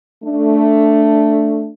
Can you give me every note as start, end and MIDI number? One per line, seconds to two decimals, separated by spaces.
0.24 1.70 57
0.24 1.70 62